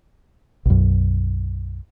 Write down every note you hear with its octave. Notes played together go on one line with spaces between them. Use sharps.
B1 F#2